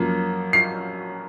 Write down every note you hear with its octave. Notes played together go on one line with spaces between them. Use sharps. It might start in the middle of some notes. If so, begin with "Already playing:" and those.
Already playing: F#2 F3 A#3
C7